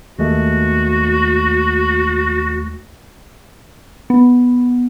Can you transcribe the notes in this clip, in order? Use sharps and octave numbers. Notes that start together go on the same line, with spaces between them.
D#2 G#3 A3 F#4
B3